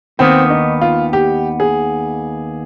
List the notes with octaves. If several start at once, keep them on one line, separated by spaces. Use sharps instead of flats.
D#2 D#3 B3 C4
D#4
F4
G4
G#4